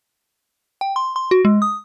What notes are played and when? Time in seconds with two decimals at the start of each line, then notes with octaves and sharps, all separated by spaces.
0.81 G5
0.96 C6
1.16 C6
1.31 F#4
1.45 G#3
1.62 D#6